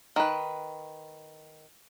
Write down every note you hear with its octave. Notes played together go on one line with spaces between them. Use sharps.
D#3 B4